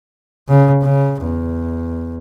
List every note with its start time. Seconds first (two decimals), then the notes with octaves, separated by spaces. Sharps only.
0.49 C#3
0.82 C#3
1.23 E2